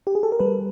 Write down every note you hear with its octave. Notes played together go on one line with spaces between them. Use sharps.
G4
G#4
A4
A#4
G3 B4